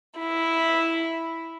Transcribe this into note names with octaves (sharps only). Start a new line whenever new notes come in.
E4